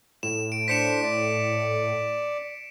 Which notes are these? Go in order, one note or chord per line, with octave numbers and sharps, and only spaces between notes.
A2 E7
D7
D4 C5 B6 C#7 E7
D5